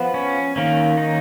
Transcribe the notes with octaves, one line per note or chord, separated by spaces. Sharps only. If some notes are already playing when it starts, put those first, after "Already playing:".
Already playing: F3 B3
C#4
D#3 A#3 C#4
D#4